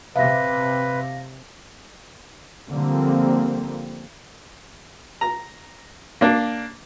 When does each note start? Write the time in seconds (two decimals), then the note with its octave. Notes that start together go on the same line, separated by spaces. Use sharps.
0.16 C3 B4 E5 F5 A#6
2.70 D3 F3 G3 A#3 C4
5.21 A#5
6.21 A#3 D4